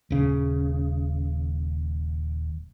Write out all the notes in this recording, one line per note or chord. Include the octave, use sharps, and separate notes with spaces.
D#1 C#3